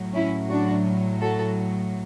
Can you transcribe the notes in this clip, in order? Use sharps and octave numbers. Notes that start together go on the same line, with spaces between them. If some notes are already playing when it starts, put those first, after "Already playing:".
Already playing: A2 F#3
C#4 E4
D4 F#4
F#4 A4